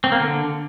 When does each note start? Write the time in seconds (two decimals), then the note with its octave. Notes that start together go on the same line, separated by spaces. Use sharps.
0.04 C4
0.12 A#3
0.20 D3